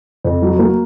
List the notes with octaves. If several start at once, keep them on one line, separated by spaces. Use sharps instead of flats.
F2
F#3
A#3